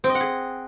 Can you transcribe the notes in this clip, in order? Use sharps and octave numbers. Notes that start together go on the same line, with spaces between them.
C4
D#5
F#5
G#4